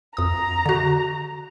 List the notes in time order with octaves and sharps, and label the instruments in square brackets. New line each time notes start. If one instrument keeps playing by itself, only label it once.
[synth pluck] F2 D#6 [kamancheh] A#5
[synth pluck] D3 F#4